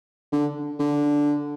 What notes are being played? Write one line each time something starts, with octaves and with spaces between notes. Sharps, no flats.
D3
D3